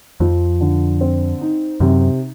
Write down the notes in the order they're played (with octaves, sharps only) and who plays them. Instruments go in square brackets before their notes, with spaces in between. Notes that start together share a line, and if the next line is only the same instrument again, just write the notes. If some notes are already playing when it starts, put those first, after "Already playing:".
[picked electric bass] F2 [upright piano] F3
[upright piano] D3
C4
D#4
[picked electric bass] F#2 [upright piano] C3